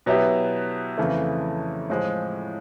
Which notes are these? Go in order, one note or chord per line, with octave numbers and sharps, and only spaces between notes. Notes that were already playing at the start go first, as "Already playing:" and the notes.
B2 F#3 B3 E4 G4
F2 C#3 E3 A3
A2 F3 G#3